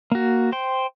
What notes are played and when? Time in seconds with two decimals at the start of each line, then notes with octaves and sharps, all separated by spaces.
0.12 A#3 F#4
0.52 C5 G5